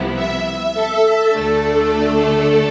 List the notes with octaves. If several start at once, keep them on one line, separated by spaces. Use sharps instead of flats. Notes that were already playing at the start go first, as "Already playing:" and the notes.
Already playing: C2 C3 F3 B3 E4
E5
A4
D2 D3 A3 D4 A4